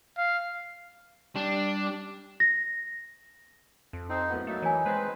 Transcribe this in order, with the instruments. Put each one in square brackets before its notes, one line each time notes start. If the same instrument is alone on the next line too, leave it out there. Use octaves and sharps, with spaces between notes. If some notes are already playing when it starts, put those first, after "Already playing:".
[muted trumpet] F5
[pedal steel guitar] G3 [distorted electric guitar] D4
[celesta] A#6
[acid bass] F2
[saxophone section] C4 [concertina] D#4
[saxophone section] F#2 A2 B3
[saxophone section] F#3 A#3 [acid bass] A3 [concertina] D#4
[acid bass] E3 [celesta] C#5 G#5
[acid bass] G#3 [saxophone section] C4 B4